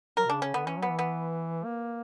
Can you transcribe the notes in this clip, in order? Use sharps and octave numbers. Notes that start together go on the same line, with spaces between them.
F#3 A#4
B2
C#3 D4
C#3 C#4
D3 B3
E3 C#4
F#3 B3
E3
B3
A#3